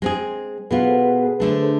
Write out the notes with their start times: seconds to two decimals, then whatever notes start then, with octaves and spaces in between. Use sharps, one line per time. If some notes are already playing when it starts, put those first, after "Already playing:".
0.02 G#3 C4 G#4
0.70 B2 B3 F4 G#4 B4
0.87 A4 C5
1.04 G#4 B4
1.22 G#4 B4
1.39 D3 A3 D4 G#4 B4
1.51 A4 C5
1.62 A4 C5